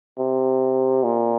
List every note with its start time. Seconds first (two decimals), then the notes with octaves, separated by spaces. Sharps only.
0.18 C3
1.04 A#2